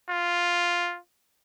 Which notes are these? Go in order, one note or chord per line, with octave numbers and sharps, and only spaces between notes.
F4